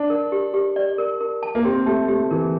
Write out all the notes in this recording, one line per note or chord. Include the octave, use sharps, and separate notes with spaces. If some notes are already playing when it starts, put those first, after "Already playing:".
Already playing: D4 A5
A#4
G4
G4
D5
A#4
A#4
A5
A#3
C4 G4
A3 G4
A3 G4
E3 A#4